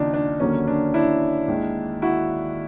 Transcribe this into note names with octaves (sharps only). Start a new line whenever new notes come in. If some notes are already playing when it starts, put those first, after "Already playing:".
Already playing: D#2 C#3 F3 D4 D#4
D4
D#2 D3 F#3 A#3 C#4
D4
D4 E4
D#2 D#3 G#3
E4 F#4